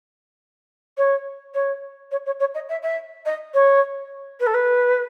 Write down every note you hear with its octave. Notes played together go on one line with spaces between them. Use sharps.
C#5
C#5
C#5
C#5
C#5
D#5
E5
E5
D#5
C#5
B4
A4
B4